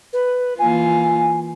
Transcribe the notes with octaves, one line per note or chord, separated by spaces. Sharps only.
B4
E3 A#3 F4 G#5